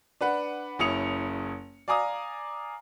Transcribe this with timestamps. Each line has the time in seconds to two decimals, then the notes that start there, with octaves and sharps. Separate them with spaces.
0.21 D4 B4 F#5
0.79 F#1 C#4 E4 D#6 C#7 F7
1.88 D5 F5 G#5 A#5 D6 D#6